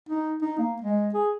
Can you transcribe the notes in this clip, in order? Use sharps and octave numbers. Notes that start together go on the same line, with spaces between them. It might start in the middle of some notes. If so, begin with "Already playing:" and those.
D#4
D#4
A#3
G#3
G#4